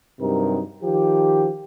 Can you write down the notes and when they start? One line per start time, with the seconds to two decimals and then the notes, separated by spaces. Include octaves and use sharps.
0.20 G2 C3 F#3 D#4 A#4
0.83 D#3 F3 G4